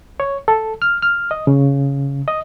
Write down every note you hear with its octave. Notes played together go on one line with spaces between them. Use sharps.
C#5
A4
F6
F6
D#5
C#3
D#5